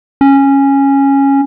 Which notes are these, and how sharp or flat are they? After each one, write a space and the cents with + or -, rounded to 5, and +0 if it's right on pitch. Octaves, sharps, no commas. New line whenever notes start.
C#4 -10